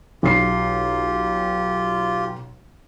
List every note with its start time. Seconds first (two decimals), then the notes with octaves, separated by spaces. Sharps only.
0.23 B1 F4 G4 C7